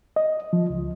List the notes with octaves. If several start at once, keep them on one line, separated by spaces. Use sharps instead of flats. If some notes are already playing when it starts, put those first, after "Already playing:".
D#5
F3
C#2